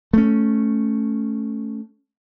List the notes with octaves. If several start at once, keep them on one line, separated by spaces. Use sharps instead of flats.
A3 C#4